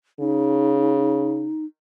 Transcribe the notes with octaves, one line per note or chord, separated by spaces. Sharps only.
C#3 D#4